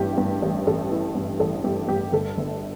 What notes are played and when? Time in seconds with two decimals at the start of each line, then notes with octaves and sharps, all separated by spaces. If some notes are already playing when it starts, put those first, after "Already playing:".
Already playing: A1 G2 E3 G4
0.18 G2
0.42 A1
0.67 A1 A4
0.92 E3
1.15 G2
1.40 A1 A4
1.64 G2 G4
1.88 G2 G4
2.12 G1 A4
2.37 G1